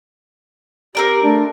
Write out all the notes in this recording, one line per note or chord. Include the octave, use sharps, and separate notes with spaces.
C4 G4 A#4 D5
A3 D4